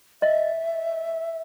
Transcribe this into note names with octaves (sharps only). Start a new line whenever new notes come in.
D#5 E5